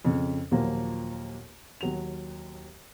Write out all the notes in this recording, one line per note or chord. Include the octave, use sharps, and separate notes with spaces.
F2 C#3
D#2 A#2 F3 F#3 A#3
D#2 F#3 F7